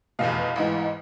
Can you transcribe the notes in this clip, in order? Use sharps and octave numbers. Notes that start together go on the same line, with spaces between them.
F1 E2 B2 F5
A1 G#2 E3